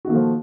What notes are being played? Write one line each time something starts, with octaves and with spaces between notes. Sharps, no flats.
D#3 F3 A3 A#3 F#4